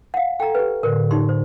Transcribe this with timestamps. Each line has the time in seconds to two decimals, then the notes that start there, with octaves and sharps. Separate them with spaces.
0.14 F5 F#5
0.40 A4 G5 A#5
0.55 G4 B4
0.83 A2 D3 A#4
1.11 D#4 G4 C6
1.29 C5